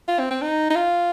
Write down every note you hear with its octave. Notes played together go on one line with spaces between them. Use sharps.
F4
C4
C4
D#4
D#4
F4